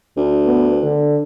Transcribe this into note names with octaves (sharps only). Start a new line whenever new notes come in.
D2
B3
D3